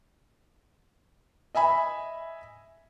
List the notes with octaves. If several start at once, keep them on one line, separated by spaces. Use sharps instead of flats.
D#5 E5 G#5 B5